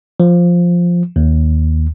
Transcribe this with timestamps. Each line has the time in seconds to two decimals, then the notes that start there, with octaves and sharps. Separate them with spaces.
0.20 F3
1.16 D#2